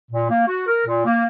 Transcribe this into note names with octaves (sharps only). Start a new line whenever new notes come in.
A#2
A#3
F#4
A#4
A#2
A#3